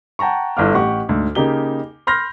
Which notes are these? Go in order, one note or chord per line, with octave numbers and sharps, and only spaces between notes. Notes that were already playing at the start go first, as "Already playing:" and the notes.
F#5 G5 A5 A#5 C#6
G1 E4 A4 F5 D6 F6
A1 G4 F#5 C#6
D2 G#2
C#3 A#3 D#4 G4 G7
B5 C6 F6 G6 A#6